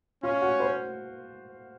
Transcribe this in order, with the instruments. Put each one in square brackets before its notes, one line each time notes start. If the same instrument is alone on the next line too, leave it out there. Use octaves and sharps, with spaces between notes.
[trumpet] C#4 [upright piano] F4
[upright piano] F#4
C5